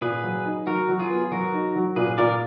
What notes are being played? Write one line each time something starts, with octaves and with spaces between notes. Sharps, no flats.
A#2 G#4 B4
F#3
D#4
F#3 F#4 A#4
F#3
F4 G#4
B3
F#3 F#4 A#4
D#4
F#3
A#2 G#4 B4
A#2 A#4 D5